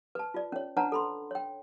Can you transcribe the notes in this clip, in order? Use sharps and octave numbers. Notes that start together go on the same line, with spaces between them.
B4 A5
F4 D5
C#4 C#5
D4 B4 C#5 F#5 A5 A#5
A4 B5 C6
C#5 G5